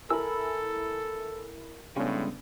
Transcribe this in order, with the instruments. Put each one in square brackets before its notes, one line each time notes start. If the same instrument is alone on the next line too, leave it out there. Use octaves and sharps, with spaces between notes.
[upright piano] E4 A#4 G#5 [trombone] A4 [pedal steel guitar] B5 E6
[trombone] A2 [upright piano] C#3 B3 D4 [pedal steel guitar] G3 G#3 C#4